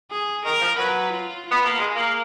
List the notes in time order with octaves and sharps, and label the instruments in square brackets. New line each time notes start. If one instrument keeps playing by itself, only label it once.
[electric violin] G#4
[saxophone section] D#3 [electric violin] A#4
[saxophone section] F3
[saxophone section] F#3 [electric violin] B4
[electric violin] F4
F4
[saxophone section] B3
A#3
[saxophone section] G#3 [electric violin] G#4
[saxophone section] A#3